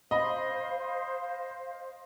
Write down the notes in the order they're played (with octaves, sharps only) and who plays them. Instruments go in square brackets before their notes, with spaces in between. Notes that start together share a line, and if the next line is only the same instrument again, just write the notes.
[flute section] C5 F5 [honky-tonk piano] D#5 B5